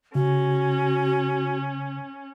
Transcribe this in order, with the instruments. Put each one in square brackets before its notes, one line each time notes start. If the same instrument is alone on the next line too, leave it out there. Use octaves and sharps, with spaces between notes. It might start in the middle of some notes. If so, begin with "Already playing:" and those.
[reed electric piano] C#3 [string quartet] C#4 [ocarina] F#4